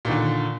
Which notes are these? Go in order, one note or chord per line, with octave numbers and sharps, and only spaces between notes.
A#2 D3 D#3